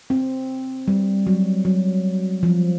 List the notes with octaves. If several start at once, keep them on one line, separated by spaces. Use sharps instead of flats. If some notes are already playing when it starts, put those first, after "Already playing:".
C4
G3
F#3
F#3
F3